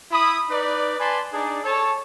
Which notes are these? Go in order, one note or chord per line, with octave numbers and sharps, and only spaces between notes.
E4 B5 D#6
D#4 B4 D5
B4 D5 G#5 A5 B5 C6
D4 D#4 G#4 D5
A4 C#5 A5